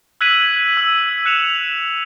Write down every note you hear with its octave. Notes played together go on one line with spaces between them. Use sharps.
E6 F#6 G#6 B6 D#7 F#7
E6
F#6 C#7 E7 F7